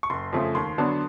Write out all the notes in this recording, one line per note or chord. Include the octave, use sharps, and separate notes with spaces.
C#6
F#1 C6
F2 C#3 F3 A3
D#2 C6
D3 F#3 B3 D4